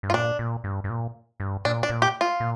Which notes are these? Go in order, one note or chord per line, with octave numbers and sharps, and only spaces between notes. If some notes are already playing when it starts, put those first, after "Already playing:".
G2
F4
A#2 D4
A#2
G2
G2
A#2
G2
A#2 D4
D4
A#2
G4
F4
A#2